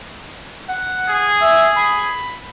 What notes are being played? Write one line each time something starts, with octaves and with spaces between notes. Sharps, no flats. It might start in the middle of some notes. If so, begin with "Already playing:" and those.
F#5
G#4
E5
B5